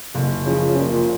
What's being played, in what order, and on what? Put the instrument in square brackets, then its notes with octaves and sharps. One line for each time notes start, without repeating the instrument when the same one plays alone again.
[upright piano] F#1
[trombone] C#3 [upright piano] F3
[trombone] A#2 [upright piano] F3